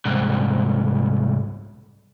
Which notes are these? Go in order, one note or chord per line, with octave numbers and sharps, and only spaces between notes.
C2 G#2